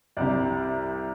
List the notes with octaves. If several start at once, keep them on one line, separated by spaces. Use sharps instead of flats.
C2 C3 G3 D5